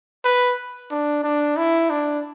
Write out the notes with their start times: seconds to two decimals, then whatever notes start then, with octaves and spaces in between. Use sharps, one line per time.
0.25 B4
0.91 D4
1.24 D4
1.57 E4
1.90 D4